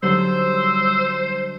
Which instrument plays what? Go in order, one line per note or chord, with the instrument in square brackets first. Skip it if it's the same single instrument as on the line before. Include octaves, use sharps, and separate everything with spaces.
[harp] D3 F#3 D#4 [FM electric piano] G3 [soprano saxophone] C5 [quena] E6